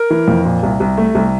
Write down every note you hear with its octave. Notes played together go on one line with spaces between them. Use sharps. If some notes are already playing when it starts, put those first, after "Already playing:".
Already playing: A#4
E3
F2
A#2
C2
C2
A3
C2